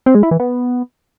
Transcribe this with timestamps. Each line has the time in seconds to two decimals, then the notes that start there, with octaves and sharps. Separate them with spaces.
0.06 C4
0.15 G#3
0.23 E4
0.31 E3
0.40 B3